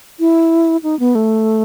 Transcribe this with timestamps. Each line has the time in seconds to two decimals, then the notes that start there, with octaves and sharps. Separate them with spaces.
0.20 E4
0.83 D#4
0.99 B3
1.15 A3